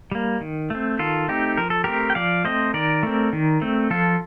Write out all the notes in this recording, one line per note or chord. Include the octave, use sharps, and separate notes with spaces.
G3 A#3
D#3
A3 C4
D#3 F4 A4
A3 C4 D#4 G4
F3 A#4
A4
A3 C4 G4 A#4
G5
F3 D5 F5
A3 C4 C5 D#5
D#3 A#4 D5
A3 C4
D#3
A3 C4
F3 F4 A4